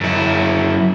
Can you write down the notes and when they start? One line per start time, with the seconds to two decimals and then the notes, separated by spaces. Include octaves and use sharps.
0.01 F#2 E4